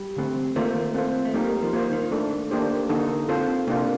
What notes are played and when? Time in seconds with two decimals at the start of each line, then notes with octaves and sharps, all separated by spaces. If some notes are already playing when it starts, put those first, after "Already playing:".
Already playing: G3
0.17 D3 A3 C4
0.56 D#3 A3 A#3 F4 C5
0.94 C4 F4 A4 C5
1.25 A3
1.34 G3 A#3 D#4 A#4
1.63 F3
1.73 D#3 A#3 F4 C5
1.92 D#3
2.11 A3 D4 A4
2.51 A#3 D4 G4 C5
2.89 D3 A#3 D#4 A4
3.29 C4 F4 A4 C5
3.67 C3 A#3 D4 F4